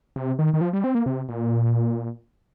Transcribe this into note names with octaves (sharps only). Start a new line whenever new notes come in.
C3
D#3
D#3
F3
G3
C4
A#3
C3
A#2